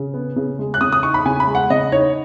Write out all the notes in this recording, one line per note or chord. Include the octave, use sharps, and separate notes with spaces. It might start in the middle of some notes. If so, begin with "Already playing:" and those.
Already playing: C#3
B3
C#3
G#3
F#6
C#3 D#6
D#6
D#4 C#6
B5
C#3 G#5
B5
G#3
F#5
C#3 D#5
D#4 C#5